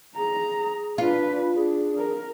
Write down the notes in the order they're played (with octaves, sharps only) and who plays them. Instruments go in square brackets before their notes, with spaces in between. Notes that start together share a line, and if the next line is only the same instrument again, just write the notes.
[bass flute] G#4 [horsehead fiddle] A#5
[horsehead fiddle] D4 B4 [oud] F4
[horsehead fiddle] D4 [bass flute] G#4
[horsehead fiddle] A#4